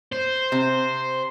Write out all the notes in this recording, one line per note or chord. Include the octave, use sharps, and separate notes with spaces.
C5
C3